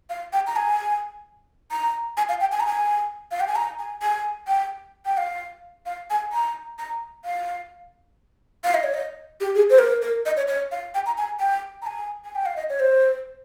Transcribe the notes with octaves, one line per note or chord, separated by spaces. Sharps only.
F5
G5
A#5
G#5
A#5
G#5
F5
G5
G#5
A#5
G#5
F5
G5
G#5
A#5
G#5
G#5
G5
G5
F5
F5
G#5
A#5
A#5
F5
F5
D#5
C#5
D#5
G4
G#4
C5
A#4
A#4
D#5
C#5
C#5
F5
G5
A#5
G#5
G5
A#5
G#5
G#5
G5
F5
D#5
C#5
C5